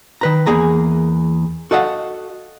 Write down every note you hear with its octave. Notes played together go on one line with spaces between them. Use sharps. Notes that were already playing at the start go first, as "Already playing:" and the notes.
D#3 B4 A#5
E2 A#3 G#4 A#5
F#4 A4 D#5 F5 F#5